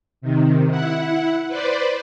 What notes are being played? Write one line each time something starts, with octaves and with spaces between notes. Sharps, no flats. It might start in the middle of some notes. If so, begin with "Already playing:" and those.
C3 D#3
E4 F#5
B4 C5 D5